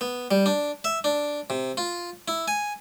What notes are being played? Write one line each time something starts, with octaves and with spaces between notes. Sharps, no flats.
B3
G3
D4
E5
D4
C3
F4
E4
G#5